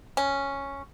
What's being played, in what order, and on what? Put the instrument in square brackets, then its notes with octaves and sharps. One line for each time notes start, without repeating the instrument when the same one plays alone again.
[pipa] C#4